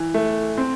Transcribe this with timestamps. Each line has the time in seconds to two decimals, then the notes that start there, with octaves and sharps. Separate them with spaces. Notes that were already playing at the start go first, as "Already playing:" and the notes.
Already playing: E3
0.14 A3
0.58 C4